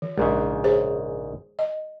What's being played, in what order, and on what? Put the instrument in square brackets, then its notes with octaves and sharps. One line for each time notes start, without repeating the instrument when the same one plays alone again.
[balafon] E3
[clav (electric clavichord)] A#1 G#2 C#3 [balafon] G#3
[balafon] G#4 C5 C#5
D#5